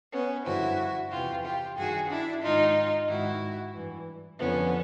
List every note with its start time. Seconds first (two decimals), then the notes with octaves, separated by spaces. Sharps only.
0.12 B3 C#4
0.45 G2 D3 F3 E4 F#4
1.11 E2 C3 E3 F4 G4
1.44 F4 G4
1.77 G2 D#3 F#4 G#4
2.09 D4 E4
2.42 G#2 D#3 D#4 F4
3.08 G#2 D#3 E4 F#4
3.74 G2 E3
4.39 F2 D3 F3 B3 C#4